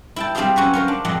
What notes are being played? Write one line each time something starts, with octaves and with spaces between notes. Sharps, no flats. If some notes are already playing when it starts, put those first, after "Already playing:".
E4 G5 A5
G3 C4 D4 F4 G4 G#4
F#3 C#4 F#4 B4
C#4 F4 A#4 C5
D4
F2 A#2 G#3 D#5 F#5